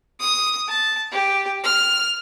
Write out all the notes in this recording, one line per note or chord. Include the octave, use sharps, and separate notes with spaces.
D#6
A5
G4
F6